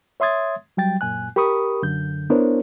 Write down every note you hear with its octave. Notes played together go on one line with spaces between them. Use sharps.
C#5 E5 C6 D#6 G#6 A6
F#3 G3 G5 A6
F#2 A#2 G#5 F#6
G4 A#4 B5 C#6 D#6
F#2 D3 G6
B3 D4 E4 A#4 C5 C#5